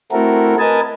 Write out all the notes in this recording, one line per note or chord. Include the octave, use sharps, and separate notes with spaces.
A3 C4 E4 F#4 A4 A#4
A#4 B4 D#5 G#5 A5